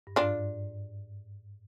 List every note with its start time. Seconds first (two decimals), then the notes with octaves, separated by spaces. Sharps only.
0.07 G2
0.16 G#2 D4 F4